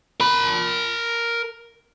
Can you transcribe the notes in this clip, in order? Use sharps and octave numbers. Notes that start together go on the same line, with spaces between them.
A#4 B5